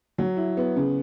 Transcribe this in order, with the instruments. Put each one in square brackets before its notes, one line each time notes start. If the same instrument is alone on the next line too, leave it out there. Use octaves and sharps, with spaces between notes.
[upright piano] F#3
E4
B3
C#3